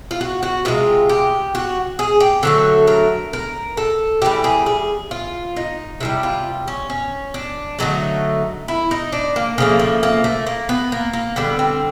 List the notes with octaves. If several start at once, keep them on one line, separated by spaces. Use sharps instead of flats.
F4
F#4
F#4
C3 E3 G#3 F4
G4
F#4
G#4
G4
D3 F#3 A3 A4
A#4
A#4
A4
C3 E3 G3 G4
G#4
G#4
F4
D#4
C3 D#3 G3 E4
F4
C#4
C#4
D4
D3 F#3 A3 D#4
E4
D#4
D4
A#3
C#3 F3 A3 A#3
A#3
A#3
A3
A#3
B3
A#3
A#3
D3 G3 B3
C4